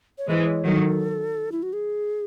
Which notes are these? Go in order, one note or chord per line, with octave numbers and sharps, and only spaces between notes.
C#5
E3 G#3 C5
C#5
D#3 F#3 A4
E4
F#4
G#4